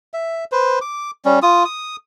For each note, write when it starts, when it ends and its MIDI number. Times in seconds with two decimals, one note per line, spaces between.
0.14 0.44 76
0.52 0.79 71
0.52 0.79 72
0.81 1.11 86
1.25 1.39 55
1.25 1.39 61
1.43 1.65 65
1.43 1.65 87
1.65 1.96 87